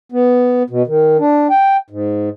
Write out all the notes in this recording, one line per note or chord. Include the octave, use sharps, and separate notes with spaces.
B3
B2
D#3
D4
G5
G#2